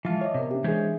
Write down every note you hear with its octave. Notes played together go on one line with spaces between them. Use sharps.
E3 F3 G#3 F4 E5 A5
C#5 D#5 E5 D6
C3 B3 A#4
C#4 D4 G4 E5
E3 G#3 G#4 C5 C#5